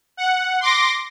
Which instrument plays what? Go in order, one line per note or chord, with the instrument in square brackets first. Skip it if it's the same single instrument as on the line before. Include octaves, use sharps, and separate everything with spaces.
[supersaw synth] F#5
C6 D6 A#6